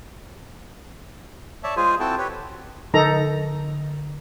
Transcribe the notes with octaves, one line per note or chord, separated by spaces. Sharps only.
C#5 D5 E5 A5
G#3 F4 G#4 C5 G#5
C4 E4 F#4 A4 G5 A5
G4 B4 C#5
D3 D#4 A4 A#5